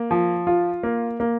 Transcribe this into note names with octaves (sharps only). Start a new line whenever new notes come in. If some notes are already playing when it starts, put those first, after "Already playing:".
Already playing: A#3
F3
F4
A#3
A#3